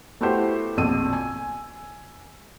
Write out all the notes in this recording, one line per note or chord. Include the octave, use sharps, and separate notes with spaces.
A3 B3 E4 F#4 G4 C5
A#1 F2 B2 E6 D#7
G#5